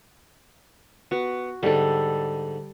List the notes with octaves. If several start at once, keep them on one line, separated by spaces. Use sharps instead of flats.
B3 F#4
G#2 D3 G3 A4